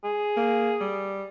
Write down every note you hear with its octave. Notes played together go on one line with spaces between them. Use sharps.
G#4
A#3
G3